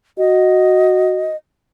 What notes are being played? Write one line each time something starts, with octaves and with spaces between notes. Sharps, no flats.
F#4 D#5